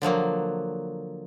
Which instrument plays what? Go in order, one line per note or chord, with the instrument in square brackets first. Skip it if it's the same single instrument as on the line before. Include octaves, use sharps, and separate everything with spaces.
[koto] D3 F3 F#3 A#3